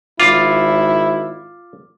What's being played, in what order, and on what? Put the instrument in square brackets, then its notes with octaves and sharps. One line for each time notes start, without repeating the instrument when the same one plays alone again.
[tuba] G#1 [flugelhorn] E4 [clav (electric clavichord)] F4 [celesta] D6 F6 A6